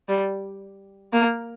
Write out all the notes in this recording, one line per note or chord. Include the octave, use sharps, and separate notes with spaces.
G3
A#3